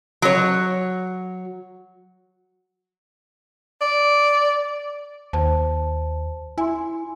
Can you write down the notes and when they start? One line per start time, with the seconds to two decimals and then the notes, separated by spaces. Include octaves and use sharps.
0.22 F#3 C#5
3.81 D5
5.33 D#2 C5 A5
6.58 E4 G#5 C6